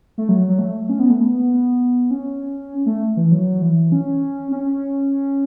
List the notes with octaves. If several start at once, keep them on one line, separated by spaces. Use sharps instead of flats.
A3
F#3
F#3
A3
C#4
B3
A3
B3
C#4
A3
E3
F#3
E3
C#4
C#4